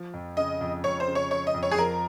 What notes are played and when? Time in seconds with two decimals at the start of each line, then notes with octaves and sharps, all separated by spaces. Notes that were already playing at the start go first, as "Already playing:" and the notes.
Already playing: F3
0.14 F2
0.37 C#3 D#5
0.61 F2
0.84 F2 C#5
1.00 C5
1.08 C#3
1.15 C#5
1.31 F3 C#5
1.47 D#5
1.54 F2
1.63 C#5
1.71 G#4
1.78 F3 A#4